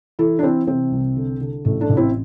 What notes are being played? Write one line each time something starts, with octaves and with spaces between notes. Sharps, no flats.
E3 E4 A4
D4
E3 C4 E4
C3 C4
C2
D3
D3
A1 A3
A3 D4
A1
C4 E4